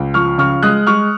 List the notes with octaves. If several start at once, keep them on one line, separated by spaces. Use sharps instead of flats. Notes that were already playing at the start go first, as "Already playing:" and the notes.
Already playing: C#2
F3 C#6 F6
C#3 C#6 F6
G#3 D#6 F#6
G#3 C#6 F6